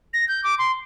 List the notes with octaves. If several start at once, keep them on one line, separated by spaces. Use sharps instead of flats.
A#6
G6
D6
C6